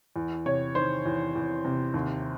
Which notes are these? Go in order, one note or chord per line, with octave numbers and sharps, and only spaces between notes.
E2
C3 C#5
D#3 C5
E2
E2
C3
D#2